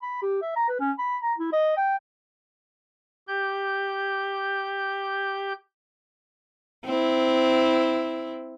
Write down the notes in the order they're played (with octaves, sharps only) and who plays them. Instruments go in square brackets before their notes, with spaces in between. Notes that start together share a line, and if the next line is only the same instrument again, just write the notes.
[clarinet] B5
G4
E5
A#5
B4
C#4
B5
A#5
E4
D#5
G5
[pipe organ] G4 G6
[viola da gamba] C4 E4